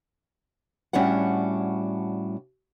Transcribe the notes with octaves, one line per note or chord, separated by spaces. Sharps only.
A2 G3 C#4 D4 F#4 F#5